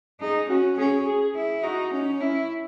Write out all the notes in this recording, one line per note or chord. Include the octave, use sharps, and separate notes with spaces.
D#4 G#4
C#4 F#4
C#4 G#4
G#4
E4
D#4 F#4
C#4 D#4
C#4 E4